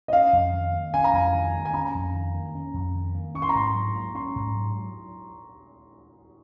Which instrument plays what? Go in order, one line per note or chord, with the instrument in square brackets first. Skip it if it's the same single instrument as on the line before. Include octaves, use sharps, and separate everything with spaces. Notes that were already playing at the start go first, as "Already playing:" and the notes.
[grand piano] D#5
[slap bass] C#4 [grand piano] F5
[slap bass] F2
D#3
A#3
[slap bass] C#4 [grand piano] G#5
[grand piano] A#5
[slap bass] F2 [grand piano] G#5
[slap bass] D#3
A#3
[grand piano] G#5
[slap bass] C#4 [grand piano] A#5
[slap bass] F2
D#3
A#3
C#4
F2
D#3
A#3
[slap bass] C#4 [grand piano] C#6
[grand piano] C6
A#5
[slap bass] G#2 [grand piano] C6
[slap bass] F#3
A#3
[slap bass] C#4 [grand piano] C6
[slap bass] G#2
F#3